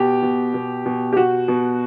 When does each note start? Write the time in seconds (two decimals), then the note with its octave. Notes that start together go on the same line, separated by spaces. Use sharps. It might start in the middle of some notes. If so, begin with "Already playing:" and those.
Already playing: B2 G4
0.22 B2
0.54 B2
0.86 B2
1.13 G4
1.17 B2 F#4
1.48 B2